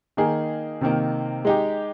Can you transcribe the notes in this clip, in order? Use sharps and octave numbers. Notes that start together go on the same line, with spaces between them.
D#3 A#3 D#4 G#4
C3 D#3 A#3 D#4
G#3 D#4 G4